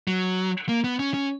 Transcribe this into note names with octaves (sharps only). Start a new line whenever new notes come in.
F#3
A#3
B3
C#4
C#4